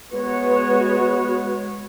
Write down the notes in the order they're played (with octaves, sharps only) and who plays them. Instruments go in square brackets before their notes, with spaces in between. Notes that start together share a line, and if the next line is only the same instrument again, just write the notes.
[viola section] G#3 B3 F#4 C#5 [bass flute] B4